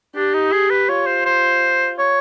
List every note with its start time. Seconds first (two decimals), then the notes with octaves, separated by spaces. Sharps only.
0.15 D4 G4
0.34 D#4
0.52 G#4
0.70 B4
0.89 F4 C#5
1.07 C5
1.26 C5
1.99 C#5